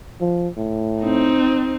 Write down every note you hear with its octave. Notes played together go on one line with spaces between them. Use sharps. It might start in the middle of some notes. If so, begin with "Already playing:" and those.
F3
A2
C4 D#4